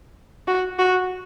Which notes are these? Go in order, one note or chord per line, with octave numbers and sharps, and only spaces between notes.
F#4
F#4